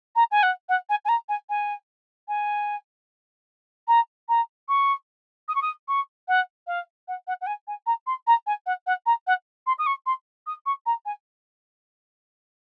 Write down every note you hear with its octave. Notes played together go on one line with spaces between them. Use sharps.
A#5
G#5
F#5
F#5
G#5
G#5
A#5
G#5
G#5
G#5
A#5
A#5
C#6
D#6
C#6
D#6
C#6
F#5
F5
F#5
F#5
F#5
G#5
G#5
A#5
C6
A#5
G#5
F#5
F#5
A#5
F#5
C6
D#6
C#6
C6
D#6
C#6
A#5
G#5